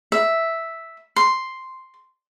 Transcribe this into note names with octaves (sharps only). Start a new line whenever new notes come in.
E5
C6